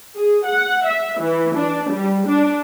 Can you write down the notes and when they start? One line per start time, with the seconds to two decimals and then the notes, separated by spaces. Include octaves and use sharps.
0.16 G#4
0.46 F#5
0.86 E5
1.19 E3
1.55 D4
1.91 G3
2.26 D4